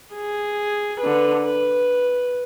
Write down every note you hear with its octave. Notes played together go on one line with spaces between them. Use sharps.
G#4
D3 B4
B4